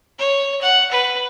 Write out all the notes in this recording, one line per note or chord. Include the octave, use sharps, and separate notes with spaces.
C#5
F#5
B4